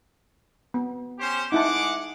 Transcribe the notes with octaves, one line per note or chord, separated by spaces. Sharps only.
B3
C#4 G4 C5
G#3 D#4 E4 F#5 A5 D6